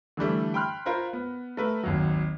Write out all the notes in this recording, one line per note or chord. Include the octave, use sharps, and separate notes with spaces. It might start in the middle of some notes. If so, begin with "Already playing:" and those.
D3 E3 G3 A3
G5 B5 C6 F6 F#6
F4 A#4 C5 B5
B3
A3 A#4 B4 E5
G#1 D#2 F#3